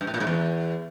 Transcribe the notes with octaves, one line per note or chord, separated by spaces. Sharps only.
G2
A2
A#2
G#2
E2